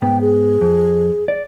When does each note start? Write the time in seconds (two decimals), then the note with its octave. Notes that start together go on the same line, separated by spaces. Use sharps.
0.02 G#2 B3 G5
0.21 G#4
0.61 F2
1.28 D5